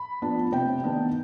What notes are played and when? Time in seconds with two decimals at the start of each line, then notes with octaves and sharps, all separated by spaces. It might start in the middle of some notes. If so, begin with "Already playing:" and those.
Already playing: B5
0.22 F3 B3 D4
0.52 C3 G5
0.84 D#3 B3 D4